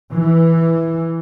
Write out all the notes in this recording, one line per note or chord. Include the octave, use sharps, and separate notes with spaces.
E3